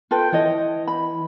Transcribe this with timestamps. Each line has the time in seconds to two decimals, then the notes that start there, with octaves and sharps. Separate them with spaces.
0.11 F4 A4 B4 G5
0.33 E3 C#5 D#5
0.87 B5